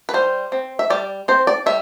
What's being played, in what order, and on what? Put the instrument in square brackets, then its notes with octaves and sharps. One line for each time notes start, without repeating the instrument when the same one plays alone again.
[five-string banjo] B4
G3 C5
C4
E5
G3 D5
C4 C5
D5
G3 E5